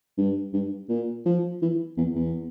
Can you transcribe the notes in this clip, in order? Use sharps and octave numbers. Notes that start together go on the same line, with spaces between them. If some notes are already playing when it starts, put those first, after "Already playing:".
G2
G2
A#2
F3
E3
E2
E2